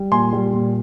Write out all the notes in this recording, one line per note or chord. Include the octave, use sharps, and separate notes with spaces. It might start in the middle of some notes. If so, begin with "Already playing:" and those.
Already playing: G3
A#2 G#5 C6
G3
A#2